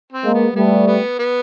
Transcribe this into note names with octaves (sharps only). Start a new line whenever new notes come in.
C4
G#3 A#3
B3
G3 A3 B3
B3
B3